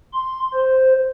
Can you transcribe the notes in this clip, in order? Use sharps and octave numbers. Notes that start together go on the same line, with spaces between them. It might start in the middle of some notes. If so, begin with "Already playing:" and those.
C6
C5